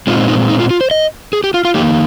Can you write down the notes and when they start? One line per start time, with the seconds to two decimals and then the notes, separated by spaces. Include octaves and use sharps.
0.07 A#2 G#3 C4 D#4 F4
0.28 D#4
0.49 D#4
0.60 F4
0.71 F4
0.81 C5
0.91 D#5
1.33 G#4
1.44 G4
1.54 F4
1.65 F4
1.75 F2 D#3 A#3 D#4 G4